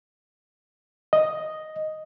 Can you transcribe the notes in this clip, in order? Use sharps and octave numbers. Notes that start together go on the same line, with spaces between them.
D#5